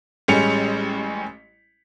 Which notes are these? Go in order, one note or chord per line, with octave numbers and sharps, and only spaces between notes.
A1 G3 G#3 C#4 C#7 F7